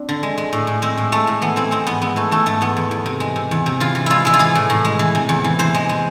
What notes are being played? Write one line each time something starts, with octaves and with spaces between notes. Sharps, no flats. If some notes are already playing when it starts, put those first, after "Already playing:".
Already playing: C4 D4
D3
G#3
G#3
A2
A2
G#3 C4
A2
G#3 A3
A2
E3 B3
E3 C4
G#3 C4
G#2 B3
G#3 B3
E3 A3
E3 A3
G#2 A3
E2 B3
E2
E2
C3
G#3
C3
E2
C3
E3 F4
E3
G#3 E4 F4
G#3 E4
F4
E3 G#4
A2
A2
G#3
E3
C3
E2
E3
E3 C5
G#3
G#3